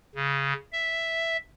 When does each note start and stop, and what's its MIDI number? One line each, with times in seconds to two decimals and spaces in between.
0.15 0.53 49
0.72 1.37 76